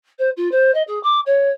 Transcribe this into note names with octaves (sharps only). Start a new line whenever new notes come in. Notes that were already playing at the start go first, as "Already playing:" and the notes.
C5
F4
C5
D#5
G#4
D6
C#5